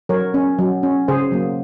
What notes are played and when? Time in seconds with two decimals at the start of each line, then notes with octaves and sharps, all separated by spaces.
0.09 F#3 A#4 C#5
0.34 C#4
0.59 F#3
0.83 C#4
1.08 C#3 G#4 C5
1.32 F#3 A#3